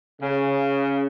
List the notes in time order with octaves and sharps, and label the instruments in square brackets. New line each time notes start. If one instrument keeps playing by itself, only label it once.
[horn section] C#3